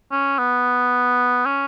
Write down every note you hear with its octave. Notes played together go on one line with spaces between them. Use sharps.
C#4
B3
C#4